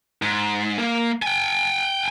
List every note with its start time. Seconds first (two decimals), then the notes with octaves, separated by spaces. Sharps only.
0.22 G#2
0.79 A#3
1.22 G5 G#5